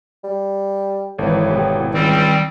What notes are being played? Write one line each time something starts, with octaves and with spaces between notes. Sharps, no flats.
G3
G#1 A2 E3
B2 B3 G4
C#2 D#3 G3 C4